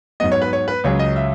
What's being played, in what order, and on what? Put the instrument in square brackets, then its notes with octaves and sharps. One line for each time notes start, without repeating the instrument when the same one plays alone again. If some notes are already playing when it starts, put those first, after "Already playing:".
[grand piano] G#2 F#3 B3 D#5
C#5
B4
C#5
B4
C#2 C#3 F#3 C#4 C#5
D#5
E5